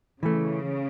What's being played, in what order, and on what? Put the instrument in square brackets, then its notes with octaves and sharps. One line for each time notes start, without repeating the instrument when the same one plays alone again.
[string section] C#3 [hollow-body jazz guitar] E3 A3